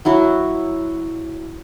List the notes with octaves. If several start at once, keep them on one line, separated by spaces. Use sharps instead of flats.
F#3 E4 F#4